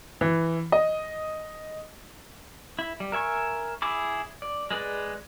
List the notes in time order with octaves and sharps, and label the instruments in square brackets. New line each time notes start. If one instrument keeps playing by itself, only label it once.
[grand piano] E3
D#5
[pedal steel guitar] E4
G3
A#4 E5 G#5 C#6
E4 G#4 B5 D6
D5
G#3 G#4 B4 D5